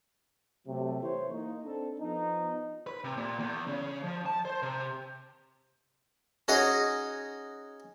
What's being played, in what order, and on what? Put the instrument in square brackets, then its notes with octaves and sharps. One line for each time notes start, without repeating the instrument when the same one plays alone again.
[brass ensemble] C3 F#3 A3
E3 E4 C5 C#5
A#3 D#4
C4 D4 A4
F3 B3 D#4
[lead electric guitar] B4
C3
A#2
E2
C#3
F3
A5
C5
C3
[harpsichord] C#4 D#4 F#4 G#4 C#5 D#5